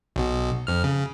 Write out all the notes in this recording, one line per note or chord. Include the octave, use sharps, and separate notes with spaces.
B1 B2
F2 F6
C#3